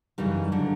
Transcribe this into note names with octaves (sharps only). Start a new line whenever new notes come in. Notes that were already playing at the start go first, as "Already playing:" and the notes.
F#2 C#3 E3 G3 D#4
D3 F#3